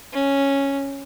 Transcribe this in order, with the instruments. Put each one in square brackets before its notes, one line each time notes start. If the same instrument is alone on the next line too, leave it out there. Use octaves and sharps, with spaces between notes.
[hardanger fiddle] C#4